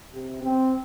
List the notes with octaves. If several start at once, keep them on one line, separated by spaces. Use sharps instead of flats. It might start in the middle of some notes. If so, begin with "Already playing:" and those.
C3
C4